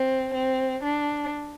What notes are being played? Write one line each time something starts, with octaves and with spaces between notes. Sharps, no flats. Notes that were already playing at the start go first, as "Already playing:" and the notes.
Already playing: C4
C4
D4